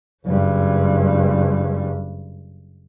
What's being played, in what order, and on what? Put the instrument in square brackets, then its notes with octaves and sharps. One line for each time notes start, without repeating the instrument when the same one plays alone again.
[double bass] F#1 G2